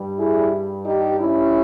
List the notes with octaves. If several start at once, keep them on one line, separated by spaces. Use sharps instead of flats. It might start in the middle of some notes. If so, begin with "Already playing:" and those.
Already playing: G2 G3
E4 G#4
D#4 G4
C#4 E4